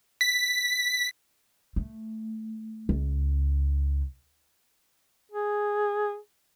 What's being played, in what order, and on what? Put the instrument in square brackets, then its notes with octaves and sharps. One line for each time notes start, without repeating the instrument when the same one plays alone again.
[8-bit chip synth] B6
[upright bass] A3
C#2
[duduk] G#4